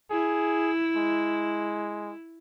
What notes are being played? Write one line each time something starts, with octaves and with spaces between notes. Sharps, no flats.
E4 G#4
G#3